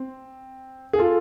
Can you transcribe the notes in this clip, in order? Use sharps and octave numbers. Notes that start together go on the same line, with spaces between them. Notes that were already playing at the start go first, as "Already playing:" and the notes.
Already playing: C4
G#4
F4 A4